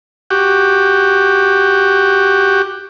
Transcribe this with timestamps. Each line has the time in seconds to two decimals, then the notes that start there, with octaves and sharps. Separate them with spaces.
0.30 F#4 G4